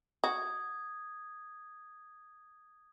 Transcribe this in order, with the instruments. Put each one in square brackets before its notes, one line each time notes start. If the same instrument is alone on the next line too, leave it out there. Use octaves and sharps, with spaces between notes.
[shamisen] F#4 [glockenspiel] D#6 G#6